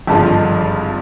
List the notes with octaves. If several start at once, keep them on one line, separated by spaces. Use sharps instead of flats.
G#1 G2 D3 F3 G#3 A5